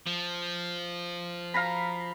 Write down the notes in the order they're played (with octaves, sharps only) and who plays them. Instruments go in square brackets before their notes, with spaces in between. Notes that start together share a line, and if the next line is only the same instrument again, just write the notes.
[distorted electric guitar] F3
[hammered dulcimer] F5 A#5 B5